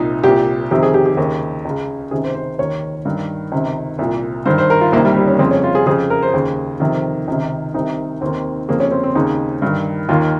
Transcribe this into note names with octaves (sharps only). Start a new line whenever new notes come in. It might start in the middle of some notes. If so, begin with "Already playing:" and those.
Already playing: C2 A#2 D#4
C2 A#2 G4
F2 C3 D#3 G4
G#4
G4
G4
D#2 C#3
C#2 C#3
C#2 C3 D#3 G#4
C5
C5
D#2 D#3 C#5
G2 D#3
C#2 C3 D#3
C2 A#2
G2 D#3 C5
C5
A#4
F4
C2 C3 D#3 A#3
G3
G3
C#4
F2 C#3 C4
C#4
F4
G#4
F2 C#3 G#4
A#4
C5
D#2 C#3
F2 C3 D#3
C#2 C3 D#3
C2 C3 D#3 D#4
D#2 D#3 C4
F2 C#3 A#3
C#4
C4
C4
D#2 C#3 D#4
G2 D#3
D#2 D#3 F4